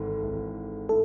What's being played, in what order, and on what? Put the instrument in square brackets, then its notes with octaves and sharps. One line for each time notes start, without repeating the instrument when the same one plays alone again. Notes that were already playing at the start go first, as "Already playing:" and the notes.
Already playing: [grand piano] G#1 G#2 E3 [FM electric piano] A4
[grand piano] G#1 G#2 E3
[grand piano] A2 [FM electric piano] A4